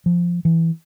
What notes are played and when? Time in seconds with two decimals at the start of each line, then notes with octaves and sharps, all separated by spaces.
0.06 F3
0.45 E3